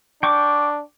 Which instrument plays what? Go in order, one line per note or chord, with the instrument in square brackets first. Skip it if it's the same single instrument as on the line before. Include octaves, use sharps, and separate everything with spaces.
[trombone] D4 [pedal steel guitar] G5 C#6 D6